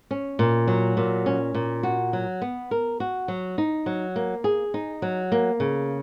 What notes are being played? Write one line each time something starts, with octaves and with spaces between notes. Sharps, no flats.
C#4
A#2
F#3
A#2
C#4
A#2
F#4
F#3
B3
A#4
F#4
F#3
D#4
F#3
A#3
G#4
D#4
F#3
A#3
C#3